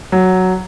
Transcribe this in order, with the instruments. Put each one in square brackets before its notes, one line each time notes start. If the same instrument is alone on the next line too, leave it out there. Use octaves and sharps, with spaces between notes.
[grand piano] F#3